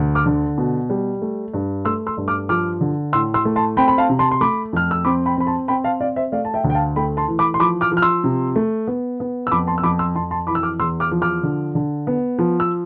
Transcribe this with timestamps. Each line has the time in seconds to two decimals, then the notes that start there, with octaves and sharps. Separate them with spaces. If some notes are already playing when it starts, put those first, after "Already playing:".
Already playing: D2
0.15 D6 F6
0.26 D3
0.58 B2
0.90 G3
1.22 A3
1.54 G2
1.85 A3 C6 E6
2.07 C6 E6
2.17 G2
2.28 D6 F6
2.49 F3 D6 F6
2.81 D3
3.13 A2 C6 E6
3.34 C6 E6
3.45 A3
3.56 A5 C6
3.77 C4 G5 B5
3.88 B5
3.98 F5 A5
4.09 C3
4.19 A5 C6
4.31 C6
4.41 A3 B5 D6
4.73 F2 F6
4.91 E6
5.05 C4 B5 D6
5.26 G5 B5
5.37 C4 B5
5.47 A5 C6
5.68 C4 G5 B5
5.84 F5 A5
6.00 C4 D5 F5
6.16 C5 E5
6.32 A3 D5 F5
6.45 A5
6.54 E5 G5
6.64 D2
6.70 G5
6.75 F5 A5
6.96 A3 G5 B5
7.17 A5 C6
7.28 E3
7.39 B5 D6
7.54 C6
7.60 F3 B5 D6
7.81 D6 F6
7.92 F3
7.97 F6
8.02 C6 E6
8.24 C3
8.56 A3
8.87 B3
9.20 B3
9.47 E6
9.51 F2 B5 D6
9.67 A5 C6
9.78 E6
9.83 F2 B5 D6
9.99 C6 E6
10.16 F2 A5 C6
10.31 A5 C6
10.47 E3 B5 D6
10.55 E6
10.63 D6 F6
10.79 E2 C6 E6
11.00 D6 F6
11.11 F3
11.22 D6 F6
11.43 D3
11.75 D3
12.07 B3
12.39 F3
12.60 E6